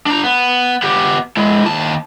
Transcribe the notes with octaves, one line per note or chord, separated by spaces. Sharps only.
D4 A#5
B3
B3 G4
G#3 E4
D#2 A5